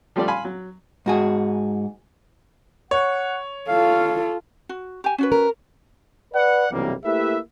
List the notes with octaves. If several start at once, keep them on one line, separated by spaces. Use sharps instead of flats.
F3 G3 A3 F4 G4 D5
F5 G#5 B5 C6
F#3
G#2 F#4 G#4
C#5 F#5
F4 A4 F5
F#4
G4 G#5
C#4 F#4 B4
A#4
B4 D5 F#5
B1 G2 C3 E3 G3 A#3
A3 A#3 E4 G4 B4 E5